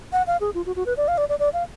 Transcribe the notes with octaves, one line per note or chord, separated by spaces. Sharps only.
F#5
F5
G#4
F4
F#4
F#4
B4
D5
F5
D5
D5
D5
F5